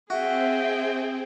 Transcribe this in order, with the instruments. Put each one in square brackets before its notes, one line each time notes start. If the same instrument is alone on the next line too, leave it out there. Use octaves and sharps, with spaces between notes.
[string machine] C4 [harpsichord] F#4 [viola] G#4 G5 [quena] E5